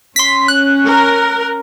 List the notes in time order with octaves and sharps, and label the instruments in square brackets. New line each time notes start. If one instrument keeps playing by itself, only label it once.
[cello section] C#4 [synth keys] C6 B6
[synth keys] F#6
[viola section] A#4